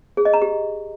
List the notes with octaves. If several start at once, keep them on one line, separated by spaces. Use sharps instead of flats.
G#4
D#5
A#5
G4